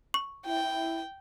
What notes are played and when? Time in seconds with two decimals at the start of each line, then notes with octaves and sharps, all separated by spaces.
0.14 C#6
0.46 E4 G5